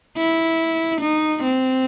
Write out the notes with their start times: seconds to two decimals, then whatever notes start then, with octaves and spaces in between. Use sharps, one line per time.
0.17 E4
1.01 D#4
1.43 C4